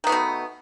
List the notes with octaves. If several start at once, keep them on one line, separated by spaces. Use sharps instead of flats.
B2 D#3 A3 B3